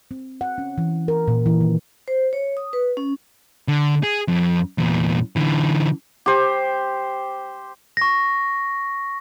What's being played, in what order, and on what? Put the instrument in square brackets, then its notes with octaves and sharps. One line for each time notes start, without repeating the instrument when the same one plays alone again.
[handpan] C4
F#5
C#4
E3
A#4
A#2
E3
D#3
[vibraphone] C5
C#5
D#6
B4
C#4
[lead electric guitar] D3
G#4
F2
E2 A#2
D3 E3
[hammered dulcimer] G4 C5
[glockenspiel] C#6 A#6